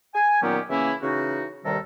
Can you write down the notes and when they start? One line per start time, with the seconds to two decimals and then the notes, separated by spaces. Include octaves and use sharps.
0.14 G#5
0.42 A#2 D#3 F#3 B3 C#4 G4
0.70 C#3 E3 A#3 C#4 E4
1.01 C#3 E3 D#4 F#4
1.65 D#2 C3 D#3 G3 A4 A#5